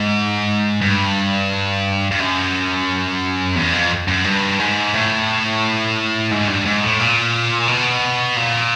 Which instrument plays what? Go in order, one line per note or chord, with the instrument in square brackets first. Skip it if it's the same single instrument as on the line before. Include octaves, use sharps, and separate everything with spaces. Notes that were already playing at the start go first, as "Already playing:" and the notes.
Already playing: [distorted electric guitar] G#2
G2
G2
F#2
E2
F2
F#2
G2
G#2
A2
G#2
G2
G#2
A2
A#2
B2
A#2